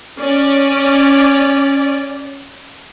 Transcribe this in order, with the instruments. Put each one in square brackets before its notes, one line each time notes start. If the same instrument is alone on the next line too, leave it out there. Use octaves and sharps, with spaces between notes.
[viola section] C#4 D5